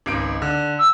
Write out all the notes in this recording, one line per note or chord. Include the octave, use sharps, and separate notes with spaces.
G#1 C#2 D7
D3
E6